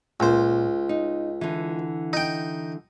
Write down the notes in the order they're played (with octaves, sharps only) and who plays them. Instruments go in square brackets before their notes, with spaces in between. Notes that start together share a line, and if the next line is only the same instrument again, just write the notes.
[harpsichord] C#2 C5 [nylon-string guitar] A#2
[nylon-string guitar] D#4
D3 E3
[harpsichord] D#4 G5